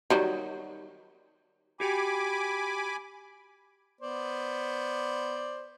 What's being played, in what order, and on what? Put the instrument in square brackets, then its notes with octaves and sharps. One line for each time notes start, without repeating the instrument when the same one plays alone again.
[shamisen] D#3 F#3 G3
[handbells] F#4 G4 G5 [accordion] G#5 B5 D6
[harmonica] B3 C5 D5